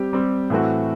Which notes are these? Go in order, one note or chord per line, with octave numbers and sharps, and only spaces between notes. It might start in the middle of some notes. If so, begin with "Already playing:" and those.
Already playing: G3 C4 G4
G3 C4 G4
A2 E3 A3 C4 F#4